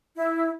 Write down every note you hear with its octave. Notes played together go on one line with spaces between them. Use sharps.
E4